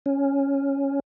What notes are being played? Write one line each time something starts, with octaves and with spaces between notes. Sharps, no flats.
C#4